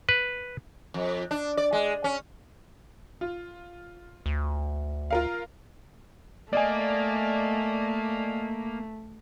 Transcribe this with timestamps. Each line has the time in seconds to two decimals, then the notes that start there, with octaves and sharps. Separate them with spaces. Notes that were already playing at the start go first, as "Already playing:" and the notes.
0.09 B4
0.94 F2
1.31 D4
1.57 D5
1.73 G#3
2.04 C#4
3.21 F4
4.26 D2
5.11 F4 A#4 F5
6.53 A3 A#3 D5 D#5 G#5